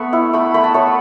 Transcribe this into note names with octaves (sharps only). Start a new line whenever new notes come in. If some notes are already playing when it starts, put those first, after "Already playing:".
Already playing: A3 B3 F#5 A5 B5 C#6
E4
A3 B5
A3 B5
A5
A3 C#5